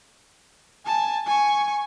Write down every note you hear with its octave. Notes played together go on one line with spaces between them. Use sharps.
G#5 A5
G#5 C#6